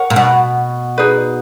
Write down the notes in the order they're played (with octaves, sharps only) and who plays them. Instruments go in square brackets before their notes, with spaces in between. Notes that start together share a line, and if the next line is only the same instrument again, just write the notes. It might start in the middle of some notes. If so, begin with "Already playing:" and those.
Already playing: [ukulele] A#4 C#5 F#5
[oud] A#2
B2
[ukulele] D#4 G#4 B4 D5